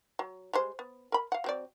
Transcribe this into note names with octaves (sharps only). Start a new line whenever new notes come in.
F#3
G3 G#3 C5
B3
A#4 B5
F5 F#5
F#3 C4 D5